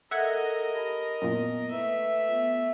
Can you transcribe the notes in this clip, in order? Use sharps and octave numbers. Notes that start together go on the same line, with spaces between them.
A4 A#4 D#5 E5 F#5 G#6
G4 A5 B5
F#2 A#2 A#3 B3 E4
A3 B4 E5
B3 F4